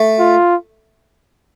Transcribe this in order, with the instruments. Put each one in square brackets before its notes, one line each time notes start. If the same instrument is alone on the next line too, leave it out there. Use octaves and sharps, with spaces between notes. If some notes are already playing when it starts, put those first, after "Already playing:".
Already playing: [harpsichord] A3
[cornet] F4